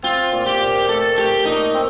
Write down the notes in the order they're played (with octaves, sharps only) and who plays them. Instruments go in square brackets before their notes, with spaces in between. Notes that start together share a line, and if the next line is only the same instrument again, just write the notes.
[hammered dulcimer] C4 [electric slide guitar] F4
[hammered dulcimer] A#2
[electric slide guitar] G4
[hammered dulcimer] A#2
[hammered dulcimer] A3 [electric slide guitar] A4
[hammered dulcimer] A3 [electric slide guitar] G4
[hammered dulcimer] A#2 [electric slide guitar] D#4
[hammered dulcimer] C4